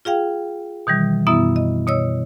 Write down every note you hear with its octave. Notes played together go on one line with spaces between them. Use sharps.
F4 G#4 F5 G5
B2 D#3 E3 G3
F#2 B2 B3 E4 E5
D#5
B2 C#5 D#5 E6